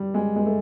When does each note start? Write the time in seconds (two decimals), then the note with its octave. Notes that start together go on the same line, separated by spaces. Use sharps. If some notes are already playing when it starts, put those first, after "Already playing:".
Already playing: G3
0.14 G#3
0.36 G#3
0.46 A3